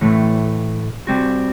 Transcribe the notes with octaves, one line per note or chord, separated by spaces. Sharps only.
A2 E3 A3
G3 C4 F#4